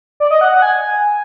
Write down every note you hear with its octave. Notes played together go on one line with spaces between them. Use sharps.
D5
D#5
F#5
F#5
G#5